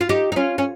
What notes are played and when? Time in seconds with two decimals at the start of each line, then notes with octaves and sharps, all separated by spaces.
0.01 F4
0.09 D#4 G4
0.32 D#4
0.36 C#4 F4
0.58 C#4